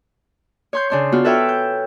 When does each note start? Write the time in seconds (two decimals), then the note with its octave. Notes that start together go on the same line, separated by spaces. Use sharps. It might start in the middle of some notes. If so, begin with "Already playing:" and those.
0.73 C#5 C6 G6
0.90 C#3 D4 C6
1.12 B3 F4 F#4
1.24 A4 B4 C#5 E5 G5 F6
1.49 G6